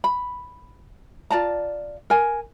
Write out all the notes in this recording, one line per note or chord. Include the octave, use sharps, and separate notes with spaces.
B5
F4 D5 A5 A#5
A#4 G#5